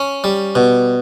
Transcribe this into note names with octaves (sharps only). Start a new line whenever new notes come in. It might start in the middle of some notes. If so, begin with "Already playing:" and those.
Already playing: C#4
G3
B2